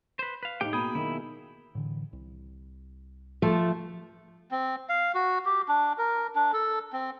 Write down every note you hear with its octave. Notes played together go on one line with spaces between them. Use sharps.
B4 C5
B4 F5
A2 A3 D#4 G4 G5
B2 A#3 G#4 G5 B5 D#6
B2 D#3 F#3 E4
A2 D3 E3
C2
F3 A3
C4
F5
F#4
G4
D4
A#4
D4
A4
C4